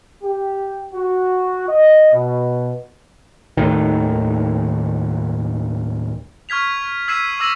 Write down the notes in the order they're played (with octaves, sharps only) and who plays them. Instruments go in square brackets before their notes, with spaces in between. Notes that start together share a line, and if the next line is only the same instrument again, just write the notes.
[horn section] G4
F#4
D#5
B2
[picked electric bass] D#2 A2 D#3
[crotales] C#6 F6 G#6 B6 F7
E6 G#6 B6 C7 D#7 E7
D6 E6 A#6 D#7 F7 F#7